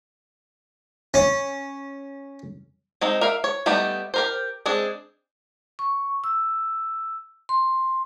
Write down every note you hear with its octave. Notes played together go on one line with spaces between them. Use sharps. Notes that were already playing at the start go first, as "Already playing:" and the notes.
C#4
G#3 C4 D#4
A#4 E5 F5
C#5
G3 A3 B3 D#4 G4
G4 A#4 C5
G#3 C4 D4 G#4
C#6
E6
C6